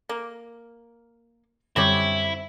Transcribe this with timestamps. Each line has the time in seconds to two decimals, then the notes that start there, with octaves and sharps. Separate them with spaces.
0.09 A#3
1.76 F#2 D3 G3 C4 E4 G4 C#5